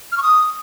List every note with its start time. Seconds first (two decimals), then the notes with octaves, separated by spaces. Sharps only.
0.12 F6
0.17 C#6
0.22 D#6